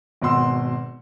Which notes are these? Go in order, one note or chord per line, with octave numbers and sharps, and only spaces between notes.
G#1 B2 F#5 C6 E6